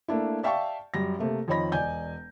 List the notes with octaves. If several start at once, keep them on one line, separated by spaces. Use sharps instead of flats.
A3 A#3 D4 E4
D5 E5 F5 G5 A5 C#6
F#2 G3 A#6
C3 A3 A#3
F2 D#3 C#5 D#5 B5 A#6
E1 D5 D#5 G#5 G6